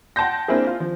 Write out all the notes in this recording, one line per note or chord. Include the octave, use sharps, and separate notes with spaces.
F#5 G5 A5 C6 G6 A#6
A#3 C4 D4 E4 G#4
F4
F3